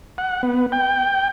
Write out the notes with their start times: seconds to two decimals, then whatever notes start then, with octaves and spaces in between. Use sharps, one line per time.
0.18 F#5
0.43 B3
0.72 G5